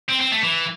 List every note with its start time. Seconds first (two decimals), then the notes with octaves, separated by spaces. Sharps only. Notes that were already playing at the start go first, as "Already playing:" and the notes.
0.09 C4
0.20 C4
0.32 A3
0.43 E3